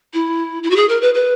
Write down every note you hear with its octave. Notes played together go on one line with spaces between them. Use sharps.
E4
E4
F#4
G#4
A#4
B4
B4